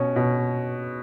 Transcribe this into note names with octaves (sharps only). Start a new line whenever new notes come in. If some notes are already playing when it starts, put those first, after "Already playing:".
Already playing: B2 C#4
B2